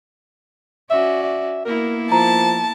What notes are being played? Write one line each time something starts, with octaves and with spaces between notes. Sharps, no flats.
C#4 F#4 D5 E5
E5
A#3 B3 E4 A#4
F3 A5 A#5